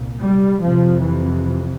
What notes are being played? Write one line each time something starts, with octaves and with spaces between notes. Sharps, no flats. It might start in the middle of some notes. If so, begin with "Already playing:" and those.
Already playing: C2 A#2
G3
F2 C3 F3
E3